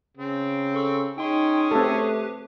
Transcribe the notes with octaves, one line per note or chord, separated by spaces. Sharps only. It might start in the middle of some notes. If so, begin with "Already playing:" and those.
C#3 C4
A4 C#6 E6
C#4 D#4 G#4 G5 C6
A3 C4 G4 A4 B4